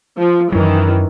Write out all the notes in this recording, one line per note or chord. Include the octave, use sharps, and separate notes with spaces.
F3
F#2 D#3 E3 F#3